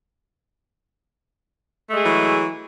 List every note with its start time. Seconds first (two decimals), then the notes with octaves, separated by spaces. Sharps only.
1.89 A3
1.93 G#3
1.97 G#4
2.01 E3
2.05 F#3